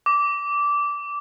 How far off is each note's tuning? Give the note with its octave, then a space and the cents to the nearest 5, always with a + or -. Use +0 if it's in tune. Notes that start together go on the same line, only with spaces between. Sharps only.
D6 -15